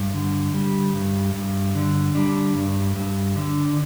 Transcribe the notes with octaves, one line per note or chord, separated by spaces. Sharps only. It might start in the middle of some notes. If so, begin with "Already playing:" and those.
Already playing: G2
D3
G3
G2
G2
D3
G3 D4
G2
G2
D3